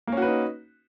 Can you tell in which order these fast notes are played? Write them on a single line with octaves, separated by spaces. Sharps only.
A#3 C#4 F#4 B4 D#4